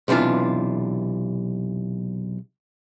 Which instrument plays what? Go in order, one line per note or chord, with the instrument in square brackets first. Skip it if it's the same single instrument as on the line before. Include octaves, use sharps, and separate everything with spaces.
[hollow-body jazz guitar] B1 C3 E3 D4 F4